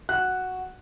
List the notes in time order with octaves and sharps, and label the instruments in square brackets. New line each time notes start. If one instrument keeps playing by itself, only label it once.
[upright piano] F#4 [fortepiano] F#6